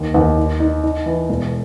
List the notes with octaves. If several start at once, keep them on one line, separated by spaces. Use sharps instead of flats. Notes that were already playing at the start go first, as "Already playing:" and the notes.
Already playing: D#2
D#2
D#4
D#4
D#4
E3
E1